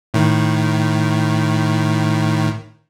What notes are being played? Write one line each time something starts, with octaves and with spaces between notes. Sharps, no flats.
A2 D#3